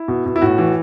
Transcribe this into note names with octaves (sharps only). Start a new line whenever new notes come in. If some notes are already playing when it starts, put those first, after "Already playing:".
Already playing: E4
B2
B2
E4
A2 F#4
E3